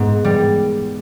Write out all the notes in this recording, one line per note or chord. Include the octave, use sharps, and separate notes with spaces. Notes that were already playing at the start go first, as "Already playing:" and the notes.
Already playing: G#2 B3
G3